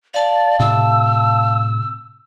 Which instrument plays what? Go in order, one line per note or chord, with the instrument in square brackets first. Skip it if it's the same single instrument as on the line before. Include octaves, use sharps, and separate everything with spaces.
[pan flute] D5 [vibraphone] F5 A5
[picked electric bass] A2 C3 [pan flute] E6